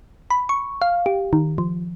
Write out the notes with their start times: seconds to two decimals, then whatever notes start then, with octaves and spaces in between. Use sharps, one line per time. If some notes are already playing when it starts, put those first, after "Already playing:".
0.30 B5
0.49 C#6
0.82 F5
1.06 G4
1.33 D#3
1.58 F3